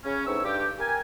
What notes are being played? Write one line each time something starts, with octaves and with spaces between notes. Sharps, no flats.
C#3 C#4
E2 A2 C4 D#4 C#6 E6
G2 G4
G4 A#4 G#5